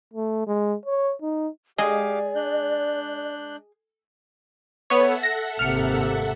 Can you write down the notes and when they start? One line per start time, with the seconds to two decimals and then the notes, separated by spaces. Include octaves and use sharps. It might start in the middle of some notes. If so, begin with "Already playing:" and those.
0.14 A3
0.47 G#3
0.85 C#5
1.22 D#4
1.78 G#3 G4 G#4 D5 D#5 F5 D6
2.35 D4 F#6 G6
4.90 B3 A4 C#5 E5 F#5
5.23 A#6
5.59 G#1 C3 A#3 F6 C#7